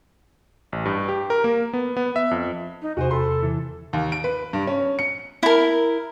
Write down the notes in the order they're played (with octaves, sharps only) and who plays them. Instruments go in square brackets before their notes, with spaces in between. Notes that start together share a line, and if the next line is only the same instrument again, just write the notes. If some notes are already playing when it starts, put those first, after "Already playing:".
[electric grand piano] A1
G2
G4
A#4
A#3
B3
B3
E5
F2
[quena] D#4
[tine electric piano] E2 C3 [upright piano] F#4 C5 [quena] G#5
[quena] A4 [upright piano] B5 C6
[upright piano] E3
D#2
D7
B4
G2
C#4
C#7
[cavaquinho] E4 A#4